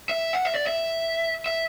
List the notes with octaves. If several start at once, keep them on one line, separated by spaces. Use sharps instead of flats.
E5
F#5
E5
D5
E5
E5